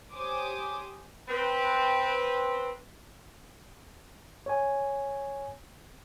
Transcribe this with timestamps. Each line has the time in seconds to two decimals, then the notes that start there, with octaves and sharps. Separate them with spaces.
0.14 G4 C5 C#5 G#5 D6 D#6
1.28 C4 B4
4.46 C#5 G#5